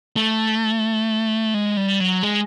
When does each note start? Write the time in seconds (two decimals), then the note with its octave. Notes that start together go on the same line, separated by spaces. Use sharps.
0.16 A3
1.54 G#3
1.77 G3
2.00 F#3
2.23 G#3